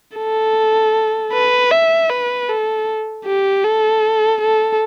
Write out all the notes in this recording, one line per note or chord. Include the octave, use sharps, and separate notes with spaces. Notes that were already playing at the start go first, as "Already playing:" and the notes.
A4
B4
E5
B4
A4
G4
A4
A4